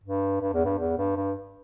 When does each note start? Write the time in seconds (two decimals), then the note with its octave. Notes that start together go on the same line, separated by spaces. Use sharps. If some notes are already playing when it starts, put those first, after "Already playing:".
0.04 G2
0.41 G2
0.54 E2
0.65 G2
0.78 E2
0.97 G2
1.16 G2